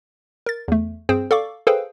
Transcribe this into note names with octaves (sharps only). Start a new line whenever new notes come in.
A#4 A6
E2 A3
G2 C4 G#4 C5 G5
A4 D5 F5 C#6 D6
G#4 A4 B4 C5 F5 G5